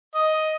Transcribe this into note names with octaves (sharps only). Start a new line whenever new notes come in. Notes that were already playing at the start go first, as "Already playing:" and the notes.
D#5